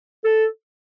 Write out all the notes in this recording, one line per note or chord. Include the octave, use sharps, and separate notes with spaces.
A4